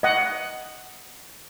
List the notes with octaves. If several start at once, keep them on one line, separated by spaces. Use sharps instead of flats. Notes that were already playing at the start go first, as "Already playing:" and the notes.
D#5 F#5